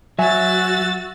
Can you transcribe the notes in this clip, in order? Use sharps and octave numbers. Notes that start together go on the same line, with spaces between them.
F#3 F#4 E5 G#5 E6 A6